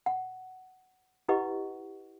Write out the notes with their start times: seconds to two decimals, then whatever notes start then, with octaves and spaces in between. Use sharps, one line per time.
0.06 F#5
1.29 E4 G4 B4 D#5 F#5 C#6